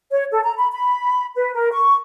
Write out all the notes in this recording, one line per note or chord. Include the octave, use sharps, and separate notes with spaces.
C#5
A4
A#5
B5
B5
B4
A#4
C#6